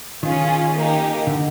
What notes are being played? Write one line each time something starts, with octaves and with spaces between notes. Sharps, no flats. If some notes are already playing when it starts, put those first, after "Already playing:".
D#3 C#4 F4 G#4
A#3 D#4 G4
D3